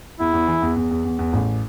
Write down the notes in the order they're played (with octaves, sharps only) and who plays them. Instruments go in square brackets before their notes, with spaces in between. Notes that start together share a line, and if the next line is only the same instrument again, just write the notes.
[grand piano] E2 [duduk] E4
[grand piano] E2
E3
E2
E2
E2
E2
E2
A1